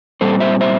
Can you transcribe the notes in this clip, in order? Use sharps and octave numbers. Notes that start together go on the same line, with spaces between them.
A#2 G3 C4 A4 C5
C5 E5
C5 E5